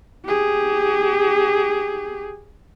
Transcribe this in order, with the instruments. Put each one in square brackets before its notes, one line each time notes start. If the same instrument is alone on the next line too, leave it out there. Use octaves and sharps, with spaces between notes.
[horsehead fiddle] G4 G#4